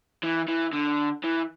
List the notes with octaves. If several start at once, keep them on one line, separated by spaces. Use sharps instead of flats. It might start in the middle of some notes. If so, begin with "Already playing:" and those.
E3
E3
D3
E3